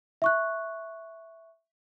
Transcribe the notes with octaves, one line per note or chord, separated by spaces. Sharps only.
E5 C#6 F#6